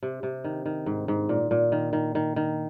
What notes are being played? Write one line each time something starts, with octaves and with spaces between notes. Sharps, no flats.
C3
C3
D#3
D#3
G#2
G#2
A#2
A#2
D#3
D#3
D#3
D#3